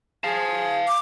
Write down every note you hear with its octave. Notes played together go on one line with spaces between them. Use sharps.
G#4 F5 A5
D6